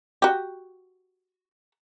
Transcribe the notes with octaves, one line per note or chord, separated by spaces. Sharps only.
F#4 G4